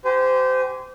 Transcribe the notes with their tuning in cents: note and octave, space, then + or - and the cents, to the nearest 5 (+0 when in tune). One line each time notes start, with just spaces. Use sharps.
G4 -25 C5 -25 G#5 +0